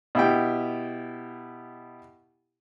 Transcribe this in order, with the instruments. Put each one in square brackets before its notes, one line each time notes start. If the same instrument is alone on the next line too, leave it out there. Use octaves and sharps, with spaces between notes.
[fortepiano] B2 E4 G4 G5